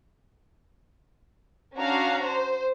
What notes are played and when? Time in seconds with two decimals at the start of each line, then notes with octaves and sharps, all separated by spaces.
1.78 C#4 D4 F#4 F5 A#5
2.27 C5